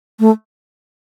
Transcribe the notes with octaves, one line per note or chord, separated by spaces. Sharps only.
A3